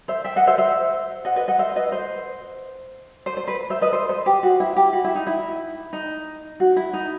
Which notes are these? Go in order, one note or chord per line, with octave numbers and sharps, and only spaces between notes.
C5 E5
E5 G5
D#5 F#5
C5 E5
C5 E5
D#5 F#5
B4 D#5
D#5 F#5
C5 E5
B4 D#5
C5
C5
C5
B4
C5 E5
B4 D#5
C5
C5
G4
F#4
E4
G4
F#4
E4
D#4
E4
D#4
F#4
E4
D#4